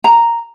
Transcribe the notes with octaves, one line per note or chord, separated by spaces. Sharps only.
A#5